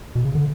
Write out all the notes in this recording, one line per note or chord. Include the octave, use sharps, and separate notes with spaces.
B2
C#3
D3